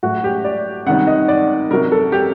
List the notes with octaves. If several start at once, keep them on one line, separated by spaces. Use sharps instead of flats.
A2 F#3 F#4
G4
D5
C3 D#3 G3 F#5
D#5
D5
C3 F#3 A#4
A4
G4